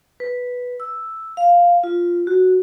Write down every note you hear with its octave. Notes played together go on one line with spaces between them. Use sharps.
B4
E6
F5
F4
F#4